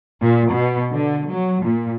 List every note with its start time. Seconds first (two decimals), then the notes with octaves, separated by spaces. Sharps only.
0.21 A#2
0.53 B2
0.93 D3
1.28 F#3
1.63 A#2